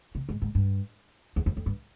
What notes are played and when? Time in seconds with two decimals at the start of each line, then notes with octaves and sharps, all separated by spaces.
0.15 C3
0.29 G#2
0.42 G#2
0.55 G2
1.36 E2
1.46 F2
1.57 F2
1.66 G2